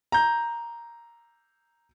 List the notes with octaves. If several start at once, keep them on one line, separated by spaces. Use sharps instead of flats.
A#5 G6